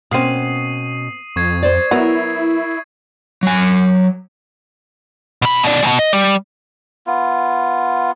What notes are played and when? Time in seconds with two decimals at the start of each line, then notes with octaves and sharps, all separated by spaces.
0.11 B2 A#3 C4 C#4 D#6 C7 D#7
1.36 F2 C#6 G#6 C7
1.63 C5 D5
1.91 F#3 B3 E4 A#4
3.43 F#3 G#5
5.42 B2 B5
5.63 B2 D5
5.83 G#2 B2
5.99 D#5
6.13 G3
7.07 B3 F4